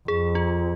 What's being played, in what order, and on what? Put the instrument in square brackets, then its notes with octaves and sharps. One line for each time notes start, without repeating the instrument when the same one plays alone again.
[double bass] F2 [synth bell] G#4
[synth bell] F4